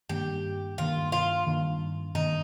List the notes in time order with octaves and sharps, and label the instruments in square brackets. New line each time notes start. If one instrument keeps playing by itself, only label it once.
[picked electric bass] G2 D#3 A#3 D4 [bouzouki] G4
[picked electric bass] G2 D#3 A#3 D4 [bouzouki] F4
[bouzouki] F4
[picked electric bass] G2 D#3 A#3 D4
[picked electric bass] G2 D#3 A#3 D4 [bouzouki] D#4